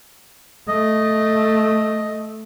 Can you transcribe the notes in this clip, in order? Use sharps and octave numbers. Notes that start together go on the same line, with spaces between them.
A3 D#5